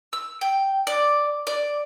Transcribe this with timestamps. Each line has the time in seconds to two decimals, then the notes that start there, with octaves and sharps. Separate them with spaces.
0.13 E6
0.41 G5
0.87 D5
1.47 D5